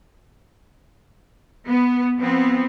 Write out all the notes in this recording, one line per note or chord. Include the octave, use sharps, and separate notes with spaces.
B3
F3 B3 C4